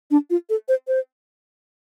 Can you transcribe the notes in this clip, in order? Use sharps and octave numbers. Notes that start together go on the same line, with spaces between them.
D4
F4
A4
C5
C5